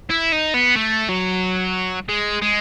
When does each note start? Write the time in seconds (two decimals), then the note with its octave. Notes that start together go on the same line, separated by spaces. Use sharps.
0.10 E4
0.32 D#4
0.54 B3
0.76 A3
1.09 F#3
2.09 G#3
2.42 G#3